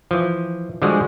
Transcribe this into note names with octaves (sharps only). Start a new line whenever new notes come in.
E3 F3
D3 F3 G3 G#3 F#4 G#4